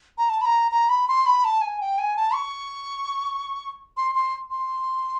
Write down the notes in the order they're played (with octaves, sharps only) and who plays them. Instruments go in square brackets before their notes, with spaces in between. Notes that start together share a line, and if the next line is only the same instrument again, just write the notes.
[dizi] A#5
A5
B5
A#5
A#5
B5
C6
B5
A5
G#5
G5
G#5
A5
C#6
C6
C6
C6